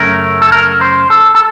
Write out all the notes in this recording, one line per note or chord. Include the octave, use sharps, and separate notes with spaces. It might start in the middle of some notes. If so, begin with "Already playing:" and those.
Already playing: F#2 C#3 A3 C#4 A#4
A4
A#4
C5
A4
A4